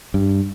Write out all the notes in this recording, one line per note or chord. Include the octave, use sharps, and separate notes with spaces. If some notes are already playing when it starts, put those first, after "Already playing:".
G2